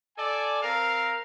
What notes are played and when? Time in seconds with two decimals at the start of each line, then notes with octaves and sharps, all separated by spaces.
0.17 A4 D5 G#5
0.62 C4 A#4 F5